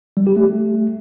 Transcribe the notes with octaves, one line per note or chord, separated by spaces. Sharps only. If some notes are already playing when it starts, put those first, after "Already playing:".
G3
G4
A3